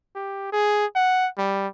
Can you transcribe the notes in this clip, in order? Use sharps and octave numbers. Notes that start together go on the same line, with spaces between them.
G4
G#4
F#5
G3